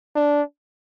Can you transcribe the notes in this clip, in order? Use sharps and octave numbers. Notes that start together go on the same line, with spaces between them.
D4